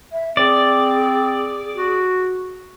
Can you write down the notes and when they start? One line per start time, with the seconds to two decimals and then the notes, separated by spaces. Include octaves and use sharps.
0.12 E5
0.37 C4 G#4 D5
1.75 F#4